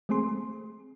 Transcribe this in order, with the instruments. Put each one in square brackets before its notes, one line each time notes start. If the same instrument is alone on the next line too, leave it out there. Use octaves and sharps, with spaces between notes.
[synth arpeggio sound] G#3 A3 C4 G#4 C6